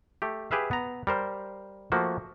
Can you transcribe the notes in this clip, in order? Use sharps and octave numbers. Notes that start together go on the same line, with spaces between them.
A3 G4
G4 G#4 B4 E5 F5
B3 A#5
G3 A#4 C5
F3 A3 A#3 F#4